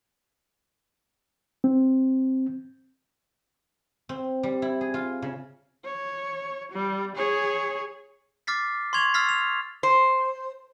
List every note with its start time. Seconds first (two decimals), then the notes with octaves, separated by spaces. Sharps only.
1.64 C4
4.09 C4
4.43 G3
4.62 E4
4.81 G#4
4.94 F4
5.22 C#3
5.85 C#5
6.72 G3
7.16 G#4 C#5
8.47 D6 F6 A6 B6 C7
8.93 C6 C#6 G#6 F7
9.14 E6 F6 A6 B6 C7
9.29 F7
9.83 C5